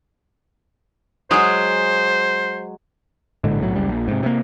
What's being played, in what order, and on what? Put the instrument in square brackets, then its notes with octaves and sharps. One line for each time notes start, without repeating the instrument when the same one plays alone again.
[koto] F#3 G#3 G#4 [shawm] C5
[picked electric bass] A#1 A2 D3 G#3
B1 A2 F#3
F#1 C#2 G3
A#1
G#2 C3
C3 A#3